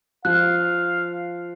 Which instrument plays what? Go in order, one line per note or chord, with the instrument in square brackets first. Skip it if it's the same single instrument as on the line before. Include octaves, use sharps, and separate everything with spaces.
[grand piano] F3 [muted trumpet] F5 [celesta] F#6